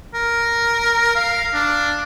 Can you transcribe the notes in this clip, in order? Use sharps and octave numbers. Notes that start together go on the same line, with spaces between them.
A#4
F5
D4